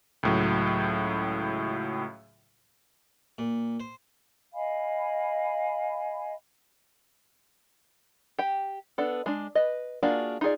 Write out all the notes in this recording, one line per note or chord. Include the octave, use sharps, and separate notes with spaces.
C#2 A2 F#3
A#2
C5
D#5 F5 G#5 B5
G4 G5
B3 D4 A4
G#3 D4
B4 D#5
A#3 D4 F4 F#4 G#4
D#4 F4 G#4 D5